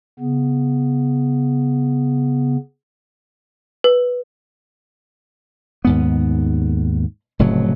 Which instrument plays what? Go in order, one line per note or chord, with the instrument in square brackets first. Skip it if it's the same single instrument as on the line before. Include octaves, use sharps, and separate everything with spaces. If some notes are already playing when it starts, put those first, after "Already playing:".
[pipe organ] C#3 B3
[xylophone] B4
[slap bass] D#2 G#2 B3
F1 A2 C#3 F#3